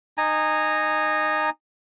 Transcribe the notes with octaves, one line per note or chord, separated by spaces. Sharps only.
D#4 G#5 A#5